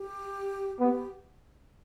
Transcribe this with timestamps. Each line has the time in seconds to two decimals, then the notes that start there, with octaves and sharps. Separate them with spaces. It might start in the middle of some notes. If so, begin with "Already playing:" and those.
Already playing: G4
0.80 B3 G4